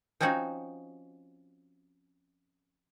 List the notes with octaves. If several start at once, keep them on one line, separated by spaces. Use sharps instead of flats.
F3 C4 C#4 D#4 F#4